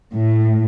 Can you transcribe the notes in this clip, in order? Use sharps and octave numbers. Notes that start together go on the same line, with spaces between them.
A2